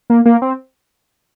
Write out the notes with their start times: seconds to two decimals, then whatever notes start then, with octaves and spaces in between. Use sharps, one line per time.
0.10 A#3
0.26 A#3
0.42 C4